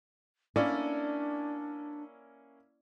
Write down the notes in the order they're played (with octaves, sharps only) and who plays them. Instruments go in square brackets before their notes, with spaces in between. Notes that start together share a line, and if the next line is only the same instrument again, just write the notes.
[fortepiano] A#3 C#4 E4 [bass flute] D4 [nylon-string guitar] D5